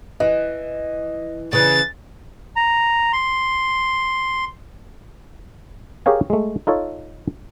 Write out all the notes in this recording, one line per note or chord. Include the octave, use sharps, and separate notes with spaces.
E3 D#5
C#3 E3 A6
A#5
C6
G4 G#4 A#4 C#5 F5 G#5
G#3 A3
D#4 F4 A4 C#5